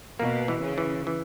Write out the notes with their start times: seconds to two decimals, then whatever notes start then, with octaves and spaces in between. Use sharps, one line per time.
0.19 B2 A#3
0.48 E3
0.63 C#3
0.78 E3
1.07 E3